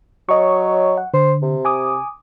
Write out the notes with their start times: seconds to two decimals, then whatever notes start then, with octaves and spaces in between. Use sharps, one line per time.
0.29 F#3 C#5 D#5 C#6
0.97 F#5
1.14 D3 C5
1.42 C3
1.65 G#5 D6 D#6